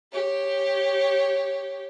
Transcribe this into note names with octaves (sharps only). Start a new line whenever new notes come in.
G4 C#5